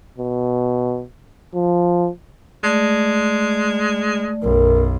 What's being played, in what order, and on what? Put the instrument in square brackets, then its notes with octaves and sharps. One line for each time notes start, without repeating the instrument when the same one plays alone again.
[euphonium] B2
F3
[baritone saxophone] G#3 [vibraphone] A3 D5
[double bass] B1 F#2 [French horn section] A#4